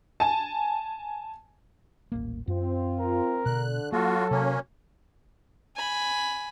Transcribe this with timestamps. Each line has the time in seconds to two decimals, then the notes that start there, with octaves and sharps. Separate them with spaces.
0.20 G#5 A5
2.12 D#1 A1 A#3
2.48 F#2 C4 F4
2.99 A#4
3.46 B2 D3 F#6
3.92 F#3 A#3 F4 F#4 A4
4.31 C3 A#3 C#4
5.76 G#5 B5